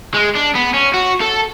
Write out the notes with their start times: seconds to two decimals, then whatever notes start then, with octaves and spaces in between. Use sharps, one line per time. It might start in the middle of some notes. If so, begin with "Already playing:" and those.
0.14 G#3
0.35 D4
0.55 B3
0.74 C#4
0.94 F#4
1.22 A4